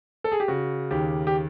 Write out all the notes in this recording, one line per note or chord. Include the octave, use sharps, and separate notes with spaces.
A4
G#4
G4
C#3 F#4
D#2 G4
G4